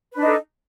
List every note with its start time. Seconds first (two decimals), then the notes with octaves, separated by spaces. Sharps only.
0.12 B4
0.16 D4
0.21 D#4
0.25 A4